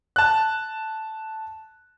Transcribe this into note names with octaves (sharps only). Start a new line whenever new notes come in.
A5 F#6